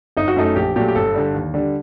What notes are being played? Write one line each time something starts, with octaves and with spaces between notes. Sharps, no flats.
G1 D#4
F#4
F#2 F#3 A3 D#4
A#1 G4
A#2 F#3 A3 G4
G4
G1 A4
G2 D3 G3
D#2
D3 G3